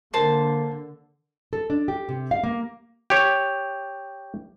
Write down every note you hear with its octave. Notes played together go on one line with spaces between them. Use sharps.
D3 A#3 A#4 C5 A5 C6
A4
D4
G4
C3
F5
A#3
G4 C#5